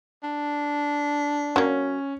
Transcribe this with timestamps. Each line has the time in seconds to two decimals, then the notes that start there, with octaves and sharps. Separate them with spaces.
0.23 D4
1.56 F#3 A#3 C#4